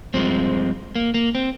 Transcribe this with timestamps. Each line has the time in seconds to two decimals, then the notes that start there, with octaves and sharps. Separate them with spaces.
0.14 G2 F3 G#3 C4
0.95 A#3
1.14 A#3
1.35 C4